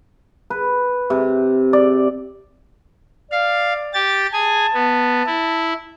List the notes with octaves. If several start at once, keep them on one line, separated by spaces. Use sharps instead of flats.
B4
C3
D5
D5 F5
G4 A6
G#4 G#5 A5
B3
E4